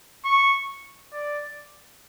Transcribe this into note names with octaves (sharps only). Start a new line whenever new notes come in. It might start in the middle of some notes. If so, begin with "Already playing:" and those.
C#6
D5